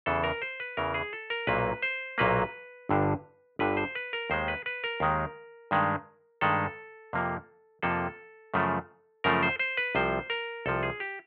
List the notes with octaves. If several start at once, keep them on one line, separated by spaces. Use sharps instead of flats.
E2 C#3 E3 A4
A#4
C5
B4
E2 C#3 E3 A#4
G#4
A4
A#4
B1 A#2 F#3 A#3 B4
C5
B1 A#2 F#3 A#3 B4
G1 G2 D3
G1 G2 D3 B4
C5
B4
A#4
D#2 D#3 G#3 C5
B4
B4
A#4
D#2 D#3 G#3
G2 D#3 G#3
G2 D#3 G#3 A4
F2 C3 F3 A#3
F2 C3 F3 A#3 A4
F#2 C#3 F3 A3
F#2 C#3 F3 A3 A#4
C5
C5
B4
C2 C3 F3 C5
A#4
C2 C3 F3 A4
G#4
G4